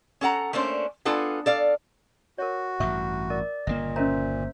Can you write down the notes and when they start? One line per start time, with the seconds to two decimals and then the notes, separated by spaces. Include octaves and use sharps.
0.21 C#4 A4 F#5 A#5
0.53 A3 A#3 C#4 D4 C5
1.05 B3 D4 F4 A4 G#5
1.46 A4 D5 F5
2.38 F#4 A#4 C#5
2.80 A1 G2 E5 C#6 D#6
3.30 A#4 D5
3.67 G1 A#2 C#3 A#3 D#5
3.96 C#4 A#4 C5 E5 A#5